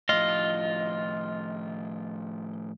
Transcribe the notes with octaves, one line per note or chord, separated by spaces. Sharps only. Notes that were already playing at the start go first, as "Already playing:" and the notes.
A2 F3 F4 D#5